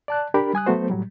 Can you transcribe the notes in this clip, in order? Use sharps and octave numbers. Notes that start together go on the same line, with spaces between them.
D5 A5 F#6
D4 G4 A#4 B5
G3 G#5 D#6 F#6
F#3 A3 B3 F#4 C5
A2 F#3 G3